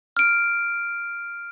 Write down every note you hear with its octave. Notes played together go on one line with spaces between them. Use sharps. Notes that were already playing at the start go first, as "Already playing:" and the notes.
F6 D7